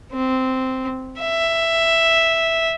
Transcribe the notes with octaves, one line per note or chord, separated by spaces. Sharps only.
C4
E5